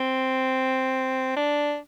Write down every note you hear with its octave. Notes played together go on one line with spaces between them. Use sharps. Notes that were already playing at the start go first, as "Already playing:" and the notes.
Already playing: C4
D4